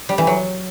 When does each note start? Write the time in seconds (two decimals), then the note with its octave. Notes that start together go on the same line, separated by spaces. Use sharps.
0.09 G3
0.18 E3
0.27 F#3